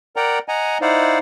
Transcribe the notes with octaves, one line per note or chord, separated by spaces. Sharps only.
A#4 D5 F#5 G5 A#5
D#5 F#5 G#5 A#5
D#4 E4 C5 D5 F5 F#5